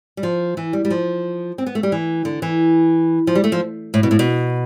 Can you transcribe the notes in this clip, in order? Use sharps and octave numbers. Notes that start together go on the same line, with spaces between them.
G3
F3
E3
G3
G3
F3
C4
B3
A3
G3
E3
D3
E3
F3
G3
A3
F3
A2
B2
A2
B2